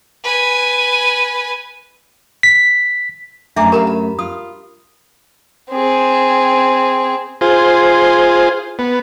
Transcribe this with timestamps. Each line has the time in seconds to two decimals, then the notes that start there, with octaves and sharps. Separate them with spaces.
0.24 B4 G#5
2.43 B6
3.56 F#2 A3 D4 G#4 D5 E5 A#5
3.72 G4 A#4 E5 F5 A#5 B5
3.87 B5
4.19 F4 D#6
5.71 C4 G#4
7.41 F4 G#4 C5
8.79 B3